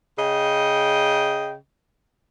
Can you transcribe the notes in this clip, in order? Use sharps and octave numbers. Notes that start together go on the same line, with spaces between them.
C#3 D#5 G5